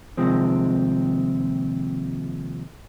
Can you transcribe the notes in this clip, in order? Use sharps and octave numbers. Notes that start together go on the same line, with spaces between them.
D#2 C3 F3 G#3 C4